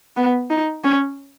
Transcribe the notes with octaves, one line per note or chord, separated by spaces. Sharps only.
B3
D#4
C#4